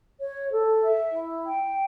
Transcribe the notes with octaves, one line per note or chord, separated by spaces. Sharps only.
C#5
A4
E5
E4
G5